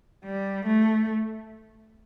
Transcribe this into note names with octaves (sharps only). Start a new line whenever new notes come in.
G3
A3